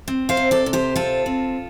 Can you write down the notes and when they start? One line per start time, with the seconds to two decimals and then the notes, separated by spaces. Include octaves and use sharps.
0.08 C4
0.29 C5 F5
0.37 C3
0.51 A4 D5
0.66 C3
0.73 G4 C5
0.96 C4 F4 A4
1.26 C4